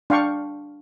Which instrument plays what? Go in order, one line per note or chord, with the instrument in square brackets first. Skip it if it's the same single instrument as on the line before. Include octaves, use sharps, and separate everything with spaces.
[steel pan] D4 F5 G5 C#6